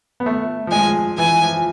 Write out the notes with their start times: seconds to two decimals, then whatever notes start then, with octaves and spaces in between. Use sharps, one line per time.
0.20 B3
0.26 A3
0.67 F3
0.72 G#3 G#5
1.18 E3 G#5
1.41 F3